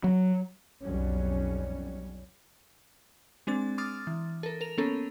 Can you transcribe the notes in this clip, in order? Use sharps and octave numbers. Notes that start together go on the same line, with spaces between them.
F#3
B1 F2 F#3 G3 C#4
G#3 C4 D4 A6
C6 D6 D#6 F6 A6
E3
A4 A#4
A#4 F7
A#3 B3 C#4 A4 A#4